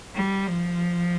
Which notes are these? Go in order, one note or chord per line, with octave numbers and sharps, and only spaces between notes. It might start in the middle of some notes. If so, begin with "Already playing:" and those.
G3
F3